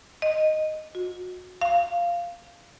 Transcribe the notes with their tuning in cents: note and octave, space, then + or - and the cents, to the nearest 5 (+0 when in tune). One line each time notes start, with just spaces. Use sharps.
D#5 +0
F#4 -25
F5 -5